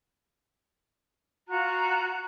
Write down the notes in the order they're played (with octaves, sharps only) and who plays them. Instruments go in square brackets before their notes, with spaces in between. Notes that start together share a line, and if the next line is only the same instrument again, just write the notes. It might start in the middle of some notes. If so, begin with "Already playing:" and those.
[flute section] F4 F#4 A#5 F#6